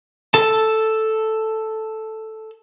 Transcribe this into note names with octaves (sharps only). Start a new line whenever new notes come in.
A4 A5